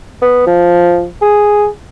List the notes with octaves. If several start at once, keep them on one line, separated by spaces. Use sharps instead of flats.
B3
F3
G#4